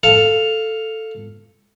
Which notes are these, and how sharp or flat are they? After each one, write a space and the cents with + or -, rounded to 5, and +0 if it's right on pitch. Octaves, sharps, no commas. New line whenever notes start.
A4 +5 F5 +0